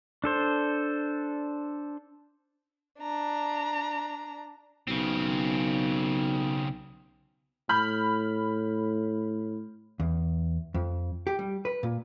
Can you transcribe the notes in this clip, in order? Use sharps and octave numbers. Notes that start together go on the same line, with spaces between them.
D4 A4 C5
D4 A#5
B1 C#3 C4
A2 B5 F6 G6
E2
F2
G4
G3
B4
A#2